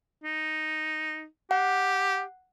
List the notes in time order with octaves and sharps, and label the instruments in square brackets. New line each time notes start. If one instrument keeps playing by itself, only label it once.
[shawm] D#4
[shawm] G4 [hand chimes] F#5